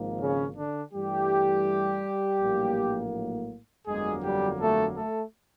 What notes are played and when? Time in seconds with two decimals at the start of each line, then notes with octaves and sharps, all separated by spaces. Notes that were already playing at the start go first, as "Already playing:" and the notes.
Already playing: G#1 G#2 F3 A#3
0.20 C#3 C#4
0.57 D3 D4
0.93 G2 E3 G3 A3 G4
2.40 A#1 A2 F#3 A#3
3.87 G1 F2 D3 F#3 G#3 A#3 G#4
4.23 G3 G4
4.60 A3 A4
4.97 A3 A4